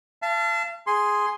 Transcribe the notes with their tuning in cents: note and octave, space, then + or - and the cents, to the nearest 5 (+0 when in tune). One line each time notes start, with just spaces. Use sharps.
F5 -40 A5 +0
G#4 +0 C6 +0